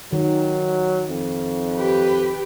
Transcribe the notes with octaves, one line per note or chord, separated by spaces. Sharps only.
D#3 F#3
F2
G4 B4